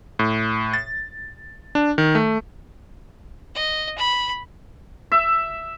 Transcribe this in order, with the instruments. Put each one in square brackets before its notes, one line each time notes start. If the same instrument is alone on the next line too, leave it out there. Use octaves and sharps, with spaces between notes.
[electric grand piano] A2
A6
D4
D#3
A3
[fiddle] D#5
B5
[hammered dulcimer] E5